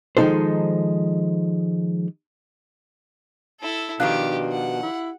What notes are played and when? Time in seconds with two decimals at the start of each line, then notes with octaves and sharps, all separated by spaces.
0.17 D#3 F3 G#3 D#4 A4 C5
3.61 E4 A4
4.00 B2 D#3 F3 D4 G4 F5 F#6
4.52 F#5
4.82 E4